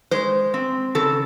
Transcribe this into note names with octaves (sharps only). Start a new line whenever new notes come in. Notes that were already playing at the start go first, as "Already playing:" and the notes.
G#3 C5
C4
C#3 A4